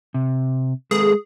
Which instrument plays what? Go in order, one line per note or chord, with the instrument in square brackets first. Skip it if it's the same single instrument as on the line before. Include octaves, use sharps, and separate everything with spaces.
[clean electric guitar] C3
[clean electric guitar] G#3 A4 B4 [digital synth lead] G#4